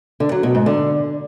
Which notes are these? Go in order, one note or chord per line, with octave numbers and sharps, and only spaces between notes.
D3
F#3
B2
G#2
D3